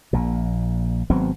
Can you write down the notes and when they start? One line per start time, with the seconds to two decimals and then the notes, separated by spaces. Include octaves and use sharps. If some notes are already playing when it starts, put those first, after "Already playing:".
0.13 A#1 A#2
1.10 G#1 F#3 B3 C4